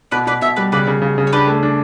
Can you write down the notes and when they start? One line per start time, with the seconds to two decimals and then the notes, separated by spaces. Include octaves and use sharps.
0.11 B2 B4 D5
0.27 B2 B4 D5
0.41 B2 C#5 E5
0.57 G3 B4 D5
0.72 C#3 B4 D5
0.87 C#3
1.02 C#3
1.18 C#3
1.27 C#5
1.33 D4 G4 B4
1.47 A3
1.63 D4